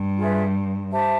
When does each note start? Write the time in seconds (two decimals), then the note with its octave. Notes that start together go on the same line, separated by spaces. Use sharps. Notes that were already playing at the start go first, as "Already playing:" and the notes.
Already playing: G2
0.18 F4 G#4 B4 E5
0.91 G4 C5 E5 A5